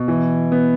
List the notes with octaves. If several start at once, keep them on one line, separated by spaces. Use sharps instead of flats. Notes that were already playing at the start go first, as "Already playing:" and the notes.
Already playing: B2
E3
B3